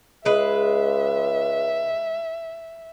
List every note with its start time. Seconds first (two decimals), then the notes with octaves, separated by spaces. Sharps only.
0.25 C#2 G#3 B4 E5